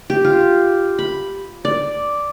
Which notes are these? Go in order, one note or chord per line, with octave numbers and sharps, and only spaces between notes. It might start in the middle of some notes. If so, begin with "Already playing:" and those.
G4
F4
B5
D5